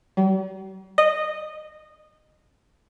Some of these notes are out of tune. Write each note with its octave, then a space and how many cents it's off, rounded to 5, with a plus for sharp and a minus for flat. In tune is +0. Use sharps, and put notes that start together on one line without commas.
G3 -45
D#5 -15